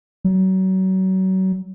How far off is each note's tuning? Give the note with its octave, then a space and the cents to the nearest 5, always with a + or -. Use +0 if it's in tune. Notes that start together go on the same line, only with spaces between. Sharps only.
F#3 +30